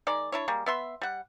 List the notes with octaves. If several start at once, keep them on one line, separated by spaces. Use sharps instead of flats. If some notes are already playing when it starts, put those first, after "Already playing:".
D#3 G#3 D5
D4 E4 C#5
G3 G#3 A#3
B3 E5 C6
G3 F#5